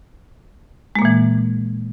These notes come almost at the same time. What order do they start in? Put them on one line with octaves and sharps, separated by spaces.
G#3 A#3 A#2 E3